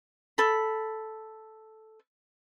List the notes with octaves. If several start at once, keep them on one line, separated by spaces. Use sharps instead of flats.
A4 B5